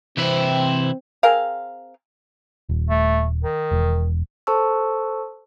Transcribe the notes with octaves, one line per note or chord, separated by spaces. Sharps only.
C3 E3 C4 E4
C4 G#4 A#4 F5
D#1
A3
D#3
E1
A4 C5 A5 C#6 E6